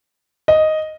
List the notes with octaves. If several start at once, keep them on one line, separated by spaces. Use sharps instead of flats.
D#5